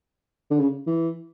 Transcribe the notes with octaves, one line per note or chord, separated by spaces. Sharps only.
D3
C#3
E3